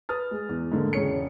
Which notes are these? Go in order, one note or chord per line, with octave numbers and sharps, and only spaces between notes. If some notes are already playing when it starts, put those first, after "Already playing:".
B4 D#6 F6 A6
G#3
E2
G#2 D3 A3 A#3
E1 C#3 C#5 C#7